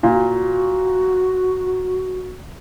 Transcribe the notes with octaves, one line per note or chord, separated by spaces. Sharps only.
A#2 F#4